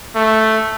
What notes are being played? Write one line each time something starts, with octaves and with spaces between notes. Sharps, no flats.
A3